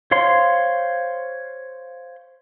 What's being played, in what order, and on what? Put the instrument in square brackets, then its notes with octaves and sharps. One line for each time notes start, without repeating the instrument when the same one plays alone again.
[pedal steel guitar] C5 C#5 F5 C6